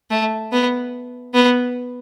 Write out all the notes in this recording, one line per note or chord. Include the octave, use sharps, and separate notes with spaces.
A3
B3
B3